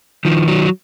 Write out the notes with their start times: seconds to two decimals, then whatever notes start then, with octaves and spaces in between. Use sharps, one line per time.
0.25 D#3 F3
0.48 F#3